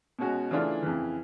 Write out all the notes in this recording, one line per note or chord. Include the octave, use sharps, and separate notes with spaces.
B2 G#3 C#4 F#4
C#3 E3 A3 D4 F4
F2 C#3 E3